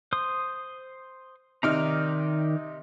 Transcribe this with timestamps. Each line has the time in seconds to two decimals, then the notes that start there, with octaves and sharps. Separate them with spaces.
0.13 C5 C6 D#6
1.63 C3 D#3 D#4 D5 A#5 F6